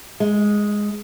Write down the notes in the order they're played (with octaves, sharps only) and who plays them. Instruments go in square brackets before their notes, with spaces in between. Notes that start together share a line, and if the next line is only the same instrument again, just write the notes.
[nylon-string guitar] G#3